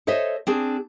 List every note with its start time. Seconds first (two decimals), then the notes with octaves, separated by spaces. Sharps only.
0.07 A4 C5 C#5 D#5 E5
0.47 C4 D4 G#4